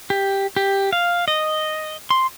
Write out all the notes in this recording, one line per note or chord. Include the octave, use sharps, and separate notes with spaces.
G4
G4
F5
D#5
C6